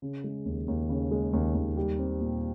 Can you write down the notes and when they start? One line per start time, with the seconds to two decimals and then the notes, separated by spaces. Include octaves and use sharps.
0.02 C#3
0.24 G#3
0.45 D#2
0.68 D#2
0.89 C#3
1.11 G#3
1.33 D#2
1.55 D#2
1.77 G3
1.99 C4
2.21 A#2